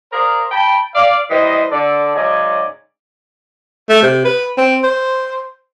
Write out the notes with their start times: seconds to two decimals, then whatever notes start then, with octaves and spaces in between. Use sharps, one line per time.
0.13 G#4 A#4 C5 D5 F5 A#5
0.51 G5 A5 B5
0.95 D5 F5
1.30 E3 G3 C5 D#5
1.71 D3 A4 D5
2.15 G#2 C#3 F#3 D5 D#5 G#5
3.89 A3
4.02 C3
4.25 B4
4.58 C4
4.84 C5